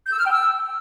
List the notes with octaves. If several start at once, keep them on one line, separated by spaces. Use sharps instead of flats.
G6
E6
F6
G5
E6